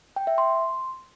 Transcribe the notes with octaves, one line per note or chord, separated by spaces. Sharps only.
G5
E5
C6